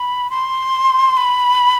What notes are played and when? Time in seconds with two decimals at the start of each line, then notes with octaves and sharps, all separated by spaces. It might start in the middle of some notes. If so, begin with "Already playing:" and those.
Already playing: B5
0.30 C6
1.17 B5